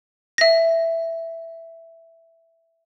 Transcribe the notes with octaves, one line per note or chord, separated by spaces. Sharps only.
E5 A#6